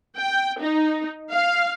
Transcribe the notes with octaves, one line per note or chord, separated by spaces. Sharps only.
G5
D#4
F5